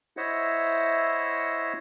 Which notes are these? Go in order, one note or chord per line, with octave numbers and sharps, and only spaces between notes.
E4 C5 C#5 D#5 E5 F#5